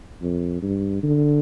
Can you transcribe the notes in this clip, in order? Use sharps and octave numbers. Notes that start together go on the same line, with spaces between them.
F2
G2
D3